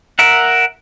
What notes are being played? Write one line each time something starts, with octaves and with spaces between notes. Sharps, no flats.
A#4 E5 F#5